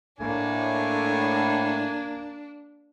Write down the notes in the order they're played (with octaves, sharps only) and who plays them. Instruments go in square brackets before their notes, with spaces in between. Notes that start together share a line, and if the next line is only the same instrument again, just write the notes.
[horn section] A2 [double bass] A#3 [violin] D4 [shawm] G#5